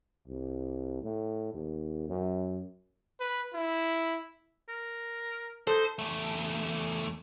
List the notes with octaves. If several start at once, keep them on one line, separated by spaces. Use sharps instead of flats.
C2
A2
D#2
F#2
B4
E4
A#4
D#4 A4 C5
E2 A3